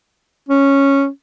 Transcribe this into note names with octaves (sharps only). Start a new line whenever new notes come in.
C#4